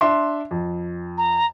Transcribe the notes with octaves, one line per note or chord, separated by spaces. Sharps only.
D4 E5 C6
F2
A#5